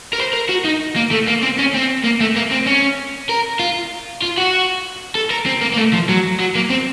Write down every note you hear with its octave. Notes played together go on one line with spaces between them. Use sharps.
A#4
C5
A#4
F#4
D#4
A#3
A3
A#3
C4
C#4
C4
A#3
A3
A#3
C4
C#4
A#4
F4
F4
F#4
A4
A#4
C4
A#3
A#3
A3
F3
F#3
F#3
A#3
C4